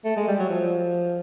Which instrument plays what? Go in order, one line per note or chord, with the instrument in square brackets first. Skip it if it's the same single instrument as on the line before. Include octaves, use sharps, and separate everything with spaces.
[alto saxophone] A3
G#3
G3
F#3
F3